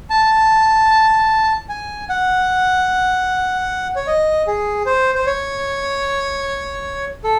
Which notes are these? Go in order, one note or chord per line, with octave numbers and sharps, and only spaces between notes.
A5
G#5
F#5
C#5
D#5
G#4
C5
C5
C#5
A4